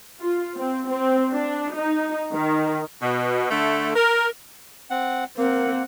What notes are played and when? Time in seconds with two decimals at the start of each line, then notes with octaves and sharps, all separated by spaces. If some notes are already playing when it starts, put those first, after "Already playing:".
0.21 F4
0.58 C4
0.89 C4
1.32 D4
1.75 D#4
2.33 D#3
3.01 B2
3.50 D3 A3
3.95 A#4
4.90 C4 F#5
5.37 A#3 C4 A#4 F#5